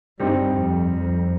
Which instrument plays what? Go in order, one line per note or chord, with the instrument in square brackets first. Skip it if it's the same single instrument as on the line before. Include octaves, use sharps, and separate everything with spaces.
[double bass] G2 [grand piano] G3 C4 D#4
[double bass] F2
F2